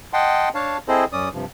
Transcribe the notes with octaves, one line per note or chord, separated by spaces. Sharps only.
D#5 F#5 G5 A5 C6
D4 C#5 F5 A5
C4 E4 G#4 A4 C5 D#5
F#2 C#4 D5 D#6
G2 C3 F3